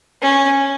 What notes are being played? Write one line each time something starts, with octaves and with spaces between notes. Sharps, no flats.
C#4